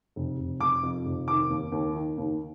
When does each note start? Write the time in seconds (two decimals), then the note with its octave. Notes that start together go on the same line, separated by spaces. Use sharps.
0.16 F1
0.38 F1
0.60 F1 D6
0.83 F2
1.06 F1
1.28 D#3 D6
1.50 D#2
1.72 D#2
1.95 D#3
2.18 D#2